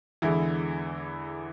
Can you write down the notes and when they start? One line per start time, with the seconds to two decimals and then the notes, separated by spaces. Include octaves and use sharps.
0.22 E2 D3 E3 G#3 E4